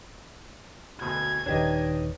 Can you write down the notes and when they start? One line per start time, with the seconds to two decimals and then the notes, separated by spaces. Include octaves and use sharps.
1.01 D2 B2 G#6
1.46 D#1 D#3 D4 D#4 G4 B4 C#5 D#5